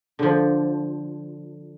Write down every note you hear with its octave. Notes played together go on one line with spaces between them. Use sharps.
D3 F3